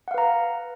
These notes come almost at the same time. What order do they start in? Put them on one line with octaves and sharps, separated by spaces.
F#5 F5 B4 A#5